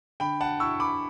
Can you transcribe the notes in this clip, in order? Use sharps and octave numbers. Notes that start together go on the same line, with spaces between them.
D3 G5 B5
F#5 A5
E4 C#6 E6
B5 D6